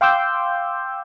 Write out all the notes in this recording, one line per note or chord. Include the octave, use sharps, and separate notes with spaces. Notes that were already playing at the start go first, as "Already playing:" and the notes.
F5 G5 C6 D6 E6 G6